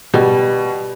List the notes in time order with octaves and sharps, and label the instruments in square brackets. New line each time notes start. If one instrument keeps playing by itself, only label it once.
[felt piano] B2 [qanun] G3